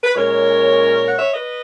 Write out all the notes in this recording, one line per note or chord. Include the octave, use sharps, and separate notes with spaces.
B4
A#2 G#3 C#4 A#4 C#5
F#5
C#5 E5
B4 D#5